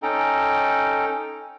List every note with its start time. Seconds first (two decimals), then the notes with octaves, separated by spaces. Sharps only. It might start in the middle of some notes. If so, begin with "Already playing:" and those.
0.03 C#4 D#4 A4 G5 A#5